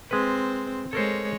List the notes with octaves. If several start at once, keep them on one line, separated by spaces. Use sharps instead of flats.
G#3 C4 B4
G#3 A4 A#4 C5 C#5